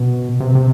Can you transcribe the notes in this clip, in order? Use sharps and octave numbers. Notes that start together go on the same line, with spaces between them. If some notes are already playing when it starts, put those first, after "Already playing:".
Already playing: B2
C3
C3